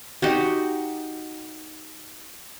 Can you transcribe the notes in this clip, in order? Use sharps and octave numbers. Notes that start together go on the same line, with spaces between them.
D#4 F#4 G4